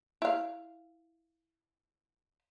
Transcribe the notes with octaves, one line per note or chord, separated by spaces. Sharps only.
E4 F5